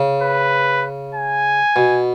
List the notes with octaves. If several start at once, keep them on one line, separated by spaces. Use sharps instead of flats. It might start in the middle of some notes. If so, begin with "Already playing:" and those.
Already playing: C#3
B4
G#5
B2